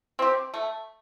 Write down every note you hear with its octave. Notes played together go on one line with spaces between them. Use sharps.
C4 G4
A3